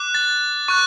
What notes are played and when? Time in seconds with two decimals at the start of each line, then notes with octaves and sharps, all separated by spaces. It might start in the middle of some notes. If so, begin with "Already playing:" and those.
Already playing: D6 F#6
0.14 A6
0.68 C#6 F#6